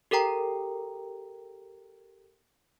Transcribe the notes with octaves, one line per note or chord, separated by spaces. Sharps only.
G4 A4 A#4 G5 A#5